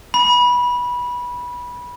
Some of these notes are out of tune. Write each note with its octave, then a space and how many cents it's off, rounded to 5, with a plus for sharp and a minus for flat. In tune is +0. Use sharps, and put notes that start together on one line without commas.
B5 -15